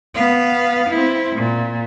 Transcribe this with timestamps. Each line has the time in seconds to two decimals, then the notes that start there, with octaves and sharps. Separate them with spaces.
0.15 B3 F5
0.90 C4 E4
1.36 A#2